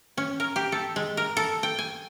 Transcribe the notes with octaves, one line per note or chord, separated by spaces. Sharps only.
C#4
A#4
G4
A4
G#3
A#4
A4
G5
G#5